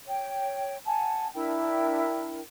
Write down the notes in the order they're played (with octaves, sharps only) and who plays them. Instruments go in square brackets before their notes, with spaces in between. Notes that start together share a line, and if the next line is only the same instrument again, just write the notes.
[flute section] C#5 G5
F#5 G#5 A5
D4 E4 A#4 G5